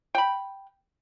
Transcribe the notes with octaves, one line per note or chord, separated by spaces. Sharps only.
G5 B5